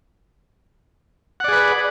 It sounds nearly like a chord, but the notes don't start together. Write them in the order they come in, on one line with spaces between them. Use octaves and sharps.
F#5 D5 G#4 B4